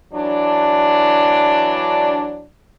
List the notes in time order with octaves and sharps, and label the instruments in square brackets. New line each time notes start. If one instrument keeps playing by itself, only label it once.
[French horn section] E3 F#3 D4